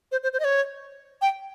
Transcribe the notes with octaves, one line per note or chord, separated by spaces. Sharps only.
C5
C5
C5
D#5
C#5
G5